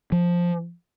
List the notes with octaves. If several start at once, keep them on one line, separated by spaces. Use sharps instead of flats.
F3